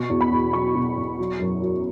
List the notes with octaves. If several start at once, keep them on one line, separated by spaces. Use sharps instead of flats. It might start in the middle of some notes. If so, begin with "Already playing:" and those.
Already playing: B2 C#6
E2
B5
E2
F#3 C#6
B2
E2
F#3
F#2
F#3